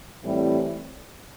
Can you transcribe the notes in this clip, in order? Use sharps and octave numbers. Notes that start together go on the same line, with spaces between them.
A2 E3 G3 C4 E4